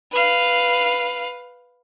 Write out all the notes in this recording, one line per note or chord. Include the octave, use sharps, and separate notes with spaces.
B4 F5